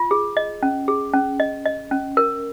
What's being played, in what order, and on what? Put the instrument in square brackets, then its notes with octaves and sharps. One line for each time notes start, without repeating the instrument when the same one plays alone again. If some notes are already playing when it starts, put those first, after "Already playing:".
Already playing: [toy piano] F4
G#4
D#5
C#4
G#4
C#4
D#5
D#5
C#4
A#4